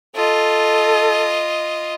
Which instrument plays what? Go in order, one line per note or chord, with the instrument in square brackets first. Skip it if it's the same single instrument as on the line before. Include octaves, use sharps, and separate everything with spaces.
[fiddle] F4 D#5 [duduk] A4